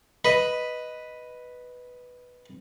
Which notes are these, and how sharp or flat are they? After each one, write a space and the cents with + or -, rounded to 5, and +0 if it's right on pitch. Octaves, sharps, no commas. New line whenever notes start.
B4 +0 D#5 +0